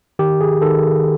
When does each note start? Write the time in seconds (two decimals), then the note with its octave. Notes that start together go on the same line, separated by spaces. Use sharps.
0.19 D#3 G4
0.41 G#4
0.62 D#3 A4